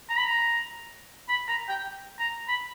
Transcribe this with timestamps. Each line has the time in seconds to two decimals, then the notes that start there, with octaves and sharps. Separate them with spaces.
0.10 A#5
0.18 B5
0.26 A#5
1.29 B5
1.49 A#5
1.69 G5
2.19 A#5
2.48 B5